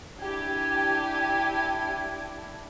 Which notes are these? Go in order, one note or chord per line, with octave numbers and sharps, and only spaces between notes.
D4 E4 G4 G#5